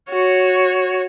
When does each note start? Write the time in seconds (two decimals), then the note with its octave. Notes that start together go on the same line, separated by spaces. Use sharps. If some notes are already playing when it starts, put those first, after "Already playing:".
0.11 F#4 C#5